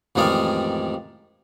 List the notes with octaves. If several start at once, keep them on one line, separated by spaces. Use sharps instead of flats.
A1 F2 D#3 G#3 D5 F5